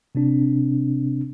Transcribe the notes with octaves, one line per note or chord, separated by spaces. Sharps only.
C3 C4 D4